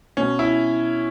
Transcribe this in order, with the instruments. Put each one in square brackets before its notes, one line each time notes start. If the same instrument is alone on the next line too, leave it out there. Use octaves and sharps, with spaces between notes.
[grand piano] B2 C#4
E4